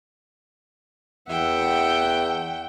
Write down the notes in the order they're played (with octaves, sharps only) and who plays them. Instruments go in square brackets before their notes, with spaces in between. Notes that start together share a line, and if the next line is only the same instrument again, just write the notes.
[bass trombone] E2 [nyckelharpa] E5 F#5 [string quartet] G5